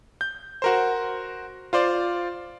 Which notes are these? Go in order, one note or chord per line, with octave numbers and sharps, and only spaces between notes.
G6
F#4 A#4 C5
F4 C5 D5